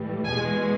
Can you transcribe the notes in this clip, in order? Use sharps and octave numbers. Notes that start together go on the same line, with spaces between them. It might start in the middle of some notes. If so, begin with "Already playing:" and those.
Already playing: A2 E3 G3
E2 B2 G#3 G#5